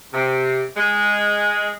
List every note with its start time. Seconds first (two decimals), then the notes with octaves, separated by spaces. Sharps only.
0.12 C3
0.75 G#3